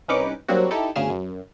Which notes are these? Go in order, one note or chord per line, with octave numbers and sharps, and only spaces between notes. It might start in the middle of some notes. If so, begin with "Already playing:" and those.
C2 C#4 D#4 B4 D6 C#7
F#3 G3 A#3 C4 D4 F#4
D#4 E4 G4 A4
G1 D2 C#3 G#4 F6 E7
F#2